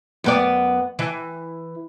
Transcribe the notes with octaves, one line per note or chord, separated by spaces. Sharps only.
F#2 B3 D5
E3